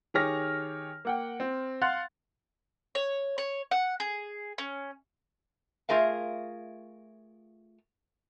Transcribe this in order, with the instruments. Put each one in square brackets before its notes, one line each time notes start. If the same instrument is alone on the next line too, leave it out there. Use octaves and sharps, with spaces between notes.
[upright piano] D#3 G4 G#4 C#5 F6 A#6
A#3 F#5 G5
C4
F5 F#5 C6 F#6 A6
[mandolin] C#5
C#5
F#5
G#4
C#4
[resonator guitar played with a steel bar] A3 F4 G#4 A#4 E5 F5